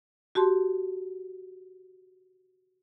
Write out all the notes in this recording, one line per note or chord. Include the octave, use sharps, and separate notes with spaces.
F#4 G4 A5 C6